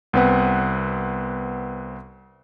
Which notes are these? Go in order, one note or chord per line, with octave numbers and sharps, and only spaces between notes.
C2 B3 C4 B4 F#5